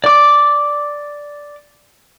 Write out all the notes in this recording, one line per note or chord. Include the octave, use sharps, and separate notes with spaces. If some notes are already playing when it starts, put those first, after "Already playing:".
D5 D6